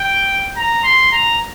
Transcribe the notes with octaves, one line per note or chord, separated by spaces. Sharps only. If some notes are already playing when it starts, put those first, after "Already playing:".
Already playing: G5
A#5
C6
A#5